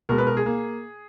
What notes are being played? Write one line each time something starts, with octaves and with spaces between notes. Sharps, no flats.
B2 G#3 A#4
B4
A#4
G#4
A#3